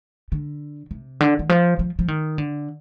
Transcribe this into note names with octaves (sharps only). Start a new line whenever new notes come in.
D3
C3
D3
D#3
F3
F3
F3
D#3
D3